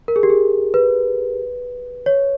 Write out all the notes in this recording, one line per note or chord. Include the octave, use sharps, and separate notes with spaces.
A#4
G#4
G4
G#4
B4
C#5